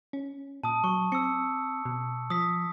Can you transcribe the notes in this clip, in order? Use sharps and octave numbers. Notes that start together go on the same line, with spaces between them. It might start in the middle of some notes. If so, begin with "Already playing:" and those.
C#4
A#2 A5 D#6
F#3 C#6
C4 E6 C#7
B2
F3 D#6 B6